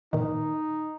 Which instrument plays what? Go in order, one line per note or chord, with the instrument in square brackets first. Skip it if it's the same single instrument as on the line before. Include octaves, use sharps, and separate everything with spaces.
[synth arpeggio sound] A#2 D#3 [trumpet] D#4